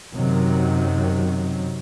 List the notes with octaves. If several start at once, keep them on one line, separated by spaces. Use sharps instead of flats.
F#2 C3 D#3 F#3